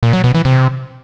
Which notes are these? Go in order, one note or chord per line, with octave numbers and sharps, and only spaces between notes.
A#2
F#3
B2
E3
C3